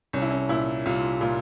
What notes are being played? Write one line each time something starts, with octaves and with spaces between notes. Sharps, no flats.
C2 C#4
E4
C#4
A#2 E4
C2 F4
A#2 F4